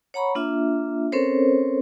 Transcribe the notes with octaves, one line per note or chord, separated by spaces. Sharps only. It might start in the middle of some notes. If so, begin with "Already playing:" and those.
C#5 F#5 A#5 B5 C#6
A#3 D4 F4 E5
C4 C#4 A4 A#4 C5 C#5